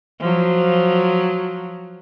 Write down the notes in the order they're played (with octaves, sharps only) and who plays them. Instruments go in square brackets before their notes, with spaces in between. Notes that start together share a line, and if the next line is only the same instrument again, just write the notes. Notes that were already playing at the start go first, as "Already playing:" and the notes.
[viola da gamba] F3 F#3